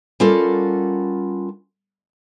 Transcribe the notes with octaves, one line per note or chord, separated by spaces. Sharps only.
G3 C#4 F4 F#4 A4 A#4